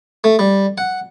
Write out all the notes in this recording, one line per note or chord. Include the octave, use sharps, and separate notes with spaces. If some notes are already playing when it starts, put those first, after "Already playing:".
A3
G3
F#5